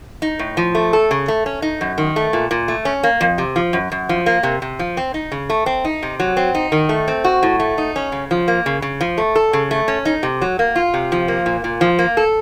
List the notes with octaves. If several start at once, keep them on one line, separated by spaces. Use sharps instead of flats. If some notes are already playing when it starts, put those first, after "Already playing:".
D#4
A2
F3
A3
A4
C#3
A3
C#4
D#4
F#2
D#3
A3
A#2
A#2
A3
C#4
A#3
F2
C3
F3
F#2
F#2
F3
A#3
C3
C3
F3
C4
D#4
C#3
A3
C4
D#4
C3
F#3
C4
D#4
D#3
A3
C4
F#4
A2
A3
D#4
C#4
C#3
F3
A#3
C#3
C#3
F3
A3
A4
C#3
A3
C#4
D#4
C3
F#3
A#3
F4
C3
F3
A#3
A#2
A#2
F3
A#3
A4